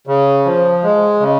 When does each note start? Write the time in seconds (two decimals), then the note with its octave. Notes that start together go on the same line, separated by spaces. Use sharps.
0.07 C#3
0.45 F3
0.83 G#3
1.20 C#3